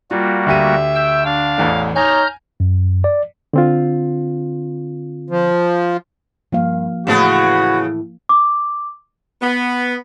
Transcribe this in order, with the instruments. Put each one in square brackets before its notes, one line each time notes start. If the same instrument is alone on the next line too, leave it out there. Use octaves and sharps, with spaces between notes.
[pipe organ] G3 A#3 F#4 [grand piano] F4
[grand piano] D2 G4 D#7 [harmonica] E5
[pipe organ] G5 E6
[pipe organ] D4 [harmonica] F5
[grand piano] A1 E2 A2
[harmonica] D#4 C#5 [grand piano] G#5 [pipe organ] A#5 F6 G6
[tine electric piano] F#2
D5
[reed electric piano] D3 C4 F4
[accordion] F3
[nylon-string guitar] G2 [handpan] F3 A#3 F5
[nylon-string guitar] A2 E3 [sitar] C#3 B3 G#4 [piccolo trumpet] F#4
[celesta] D6
[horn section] B3